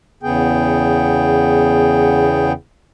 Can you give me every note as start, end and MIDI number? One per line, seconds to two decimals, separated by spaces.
0.23 2.52 40
0.23 2.52 49
0.23 2.52 59
0.23 2.52 68
0.23 2.52 79